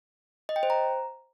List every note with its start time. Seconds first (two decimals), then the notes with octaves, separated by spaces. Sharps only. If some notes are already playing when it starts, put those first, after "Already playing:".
0.49 D#5
0.56 G5
0.63 C5
0.70 A#5